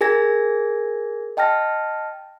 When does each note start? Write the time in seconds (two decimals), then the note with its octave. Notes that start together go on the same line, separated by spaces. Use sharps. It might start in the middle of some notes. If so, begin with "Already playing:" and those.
0.01 G#4 A#4 G#5 G#6 A#6
1.37 D#5 G5 A5 F6 A#6